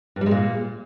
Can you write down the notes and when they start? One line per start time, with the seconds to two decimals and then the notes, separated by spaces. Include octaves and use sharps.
0.16 G2
0.21 G3
0.26 G#3
0.31 A#2